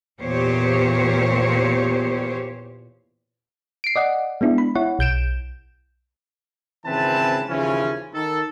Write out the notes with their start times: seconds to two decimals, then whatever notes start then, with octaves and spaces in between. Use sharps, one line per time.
0.20 E2 A#2 G4 C5 C#5
3.84 C7 D7
3.96 D5 D#5 F#5
4.41 G#3 B3 D4 E4
4.58 B5
4.75 E4 C#5 F#5
4.99 B1 G6 D7 E7
6.86 G#1 C#3 E3 C4 B4 A5
7.49 D#2 C#3 E3 F3 C#4
8.13 D#3 A4